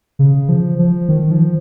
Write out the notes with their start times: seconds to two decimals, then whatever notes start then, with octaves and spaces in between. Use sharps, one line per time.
0.19 C#3
0.49 F3
0.79 F3
1.09 D#3
1.31 F3